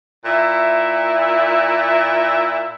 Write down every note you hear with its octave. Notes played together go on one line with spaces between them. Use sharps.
A#2 E4 E5